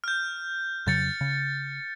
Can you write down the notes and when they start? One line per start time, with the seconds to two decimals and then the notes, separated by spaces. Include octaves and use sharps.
0.04 F6 G6
0.87 F2 C#3 F#3 G6 A6 C#7
1.21 C#3